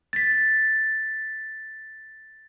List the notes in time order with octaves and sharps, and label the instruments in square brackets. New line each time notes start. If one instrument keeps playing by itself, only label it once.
[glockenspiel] A6 B6